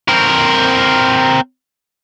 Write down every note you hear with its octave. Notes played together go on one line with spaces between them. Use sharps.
C4 A#4